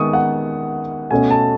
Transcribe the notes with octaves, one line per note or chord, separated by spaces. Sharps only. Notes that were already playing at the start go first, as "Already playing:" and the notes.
Already playing: D#3 G#3 B3 C#6 D#6
F#5
B2 A3 C#4 G#5
A5